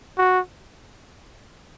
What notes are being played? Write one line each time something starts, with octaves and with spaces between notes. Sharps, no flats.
F#4